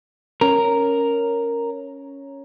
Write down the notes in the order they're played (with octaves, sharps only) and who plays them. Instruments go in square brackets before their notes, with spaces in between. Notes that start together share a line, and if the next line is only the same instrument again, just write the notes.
[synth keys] C#4 C#5 A#5 [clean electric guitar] A#4